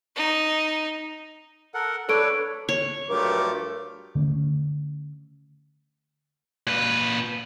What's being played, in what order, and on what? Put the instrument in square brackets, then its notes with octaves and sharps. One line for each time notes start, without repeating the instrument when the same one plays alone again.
[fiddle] D#4
[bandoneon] A4 A#4 F#5
[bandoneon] D4 B4 C#5 [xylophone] A4 D7
[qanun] C#5
[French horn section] G2 F#3 A#4 [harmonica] F3 A3 D6
[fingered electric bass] D3 A3 C#4
[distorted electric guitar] A#2 B4